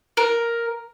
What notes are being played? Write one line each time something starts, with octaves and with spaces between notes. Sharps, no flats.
A#4